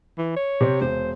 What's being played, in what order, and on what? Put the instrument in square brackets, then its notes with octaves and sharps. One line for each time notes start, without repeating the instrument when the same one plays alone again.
[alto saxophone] E3
C#5
[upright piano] C3 C5
[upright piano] E1 [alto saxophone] C5